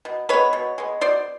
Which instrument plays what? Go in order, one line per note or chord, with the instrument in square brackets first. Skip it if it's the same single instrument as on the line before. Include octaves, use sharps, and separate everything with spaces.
[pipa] B2
G#3 B3 B4 C#5
B2
G#3 B3
B2 C5 D5